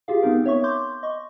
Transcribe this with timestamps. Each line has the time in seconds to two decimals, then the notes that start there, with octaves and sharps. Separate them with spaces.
0.08 F4 G4 G#4 F5
0.22 B3 C4 D#4 A#4
0.44 B3 C#5 E5 C#6
0.64 C6 D6 G6
1.03 D#5 C#6